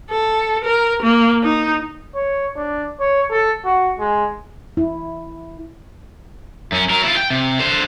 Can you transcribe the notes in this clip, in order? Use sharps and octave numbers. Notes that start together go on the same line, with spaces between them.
A4
A#4
A#3
D#4
C#5
D4
C#5
A4
F#4
G#3
E4
F#2 C#4
F#3 A#4
E4 F4
G5
C3
D3 C5